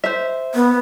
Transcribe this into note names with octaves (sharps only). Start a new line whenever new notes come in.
C5 E5
B3